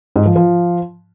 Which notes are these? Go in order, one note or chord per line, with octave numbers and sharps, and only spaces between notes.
G#2
F3
F3